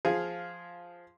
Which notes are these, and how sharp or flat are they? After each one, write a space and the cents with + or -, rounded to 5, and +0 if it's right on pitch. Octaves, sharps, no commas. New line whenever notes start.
F3 +0 G#4 +0 F5 +0